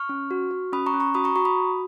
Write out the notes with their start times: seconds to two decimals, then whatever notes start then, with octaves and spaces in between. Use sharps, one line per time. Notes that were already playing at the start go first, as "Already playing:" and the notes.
Already playing: C#6 F6
0.09 C#4
0.31 F#4
0.51 F#4
0.72 C#4 B5 D#6
0.86 A#5 C#6
0.94 C#4
1.00 A#5 C#6
1.14 F#4 B5 D#6
1.24 A#5 C#6
1.36 F#4 A#5 C#6
1.45 B5 D#6
1.57 F#4